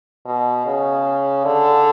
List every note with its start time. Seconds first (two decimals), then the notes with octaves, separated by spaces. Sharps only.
0.26 B2
0.66 C#3
1.45 D3